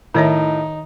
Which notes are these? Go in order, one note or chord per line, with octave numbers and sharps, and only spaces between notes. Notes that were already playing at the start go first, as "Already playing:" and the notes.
A2 D#3 D#4 C#5 E5